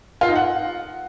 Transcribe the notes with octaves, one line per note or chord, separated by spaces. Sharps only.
F4
D#4
F#5